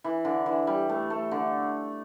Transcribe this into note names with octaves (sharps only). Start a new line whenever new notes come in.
E3
D3
E3
G3
A3
A3
D3